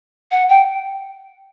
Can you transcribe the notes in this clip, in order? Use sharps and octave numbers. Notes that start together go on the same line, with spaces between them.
F#5
G5